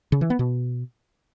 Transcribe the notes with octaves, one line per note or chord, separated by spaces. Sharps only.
C#3
E3
B3
B2